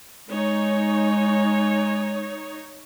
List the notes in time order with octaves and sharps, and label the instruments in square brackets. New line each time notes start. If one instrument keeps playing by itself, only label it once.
[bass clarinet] G#3 [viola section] D#4 C#5